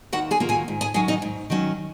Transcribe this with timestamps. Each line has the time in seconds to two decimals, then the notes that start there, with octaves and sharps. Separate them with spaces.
0.13 D#2 F#4 F#5
0.31 G#4 G#5
0.40 D#3 F#3 A#3 F4
0.49 G#4 G#5
0.68 G#2
0.81 G#4 G#5
0.94 D#3 F#3 C#4 G#4 G#5
1.08 D#4 D#5
1.22 G#2
1.50 D#3 F#3 C#4